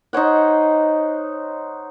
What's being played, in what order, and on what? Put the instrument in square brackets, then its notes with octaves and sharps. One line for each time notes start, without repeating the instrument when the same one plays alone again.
[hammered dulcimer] D#4 C5 C#5 F#5